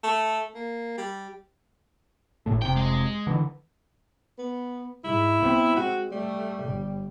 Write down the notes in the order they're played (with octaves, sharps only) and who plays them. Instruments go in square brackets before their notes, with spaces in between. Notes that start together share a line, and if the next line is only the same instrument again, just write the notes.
[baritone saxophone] A3
A#3
G3
[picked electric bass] G#1 A2 A3
[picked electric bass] F1 C3 [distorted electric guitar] G5
[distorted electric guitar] G#3
[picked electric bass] D3 E3
[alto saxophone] B3
[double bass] G#2 [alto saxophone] E4
[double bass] B3 C4
[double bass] G#3 [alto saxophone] F#4
[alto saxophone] G3 [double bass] A3
[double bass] G1